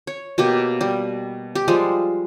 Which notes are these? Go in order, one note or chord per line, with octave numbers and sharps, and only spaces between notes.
C#5
B2 A#3 G4
G3
G4
F3 G3 G#3